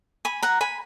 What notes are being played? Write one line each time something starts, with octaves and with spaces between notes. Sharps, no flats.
G#5 B5
F#5 A#5
G#5 B5